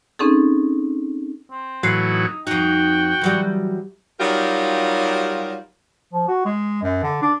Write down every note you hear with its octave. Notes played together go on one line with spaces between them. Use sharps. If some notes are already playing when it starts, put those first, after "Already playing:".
C4 C#4 D#4 G#4 A4
C4
A2 E3 F#3 F5
D#4
F2 D#4 F#4 G5
E3 F#3 G3
F#3 G3 D#4 F4 G4 A#4
F3
F#4
G#3
F#2
D3
D4